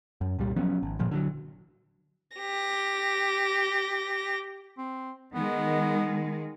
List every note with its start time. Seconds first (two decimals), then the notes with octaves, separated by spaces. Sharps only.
0.21 F#2
0.39 C2 A#2 G3
0.56 F3 F#3 B3 C#4
0.83 G#1
0.99 G1 A#2 F3
1.11 D3 F3 F#3
2.37 G4 A#6
4.78 C4
5.33 D#3 G#3 B3